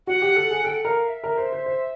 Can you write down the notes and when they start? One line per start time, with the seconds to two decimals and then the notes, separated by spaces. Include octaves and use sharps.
0.07 F#4 F#5
0.22 G4
0.36 A4
0.51 G#4
0.65 A4 G5
0.70 F#5
0.85 A#4 F5
1.04 F5
1.08 E5
1.24 A#4
1.38 C5
1.52 C5
1.66 C5